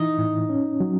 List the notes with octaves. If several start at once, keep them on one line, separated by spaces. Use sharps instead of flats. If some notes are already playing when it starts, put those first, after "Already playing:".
Already playing: E3 D#4 E4
A2
C#4
F#3